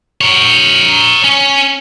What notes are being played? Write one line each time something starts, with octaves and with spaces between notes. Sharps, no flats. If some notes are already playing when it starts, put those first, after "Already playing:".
A#4 C#5
C#4